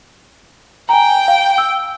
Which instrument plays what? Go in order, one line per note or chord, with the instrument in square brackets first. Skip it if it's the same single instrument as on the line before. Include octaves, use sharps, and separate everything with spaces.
[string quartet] G5 [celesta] G#5 A#5
[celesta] F5
E6